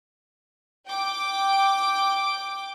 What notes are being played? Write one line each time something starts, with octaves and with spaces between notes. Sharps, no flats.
G5 D6